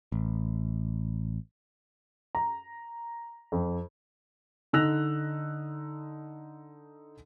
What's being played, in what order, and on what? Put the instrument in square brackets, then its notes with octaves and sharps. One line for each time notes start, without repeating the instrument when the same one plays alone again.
[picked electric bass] A1
[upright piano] A#5
F2
[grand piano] D3 D#4 E6 F#6 A#6 F7